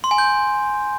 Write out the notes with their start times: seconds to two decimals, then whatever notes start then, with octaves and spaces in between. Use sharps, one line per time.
0.04 C6
0.11 G#5
0.18 G6